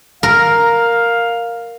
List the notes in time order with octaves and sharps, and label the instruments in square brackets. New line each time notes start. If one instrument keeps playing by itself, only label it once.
[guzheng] A#4 [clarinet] F5